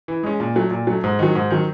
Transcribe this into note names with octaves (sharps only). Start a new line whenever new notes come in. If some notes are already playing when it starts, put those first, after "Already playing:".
E3
G#3 C#4
A#2
F#3 A3
A#2
F#3 A3
G#2
D#3 F#3
G#2
D#3 F#3